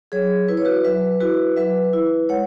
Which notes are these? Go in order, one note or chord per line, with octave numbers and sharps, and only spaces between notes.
F#3 G#4 C#5
E4 B4
C#5
F#4 B4
F#3 B4 E5
E4 F#4 B4
F#3 B4 E5
E4
G#3 C#5 F#5